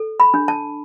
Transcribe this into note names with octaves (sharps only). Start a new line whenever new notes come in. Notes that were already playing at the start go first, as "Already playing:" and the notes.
Already playing: A4
B5
D4
A5